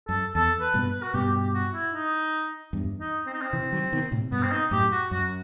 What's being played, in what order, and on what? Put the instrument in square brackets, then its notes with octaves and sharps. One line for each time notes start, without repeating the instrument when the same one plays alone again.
[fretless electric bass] F#2 [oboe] A4
[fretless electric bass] E2 [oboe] A4
[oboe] B4
[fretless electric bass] G2 B2
[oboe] B4
F#4
[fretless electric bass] G2 B2 [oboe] G4
[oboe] G4
F#4
E4
D#4
[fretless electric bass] E2 G2
[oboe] D#4
C4
D#4
C4
[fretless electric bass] C3 E3
D#3 F#3
B2 D#3
A2 C3
[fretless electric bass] G2 B2 [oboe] B3
[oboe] C4
D#4
[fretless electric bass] F#2 A2 [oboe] G4
[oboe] F#4
[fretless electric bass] F#2 [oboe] F#4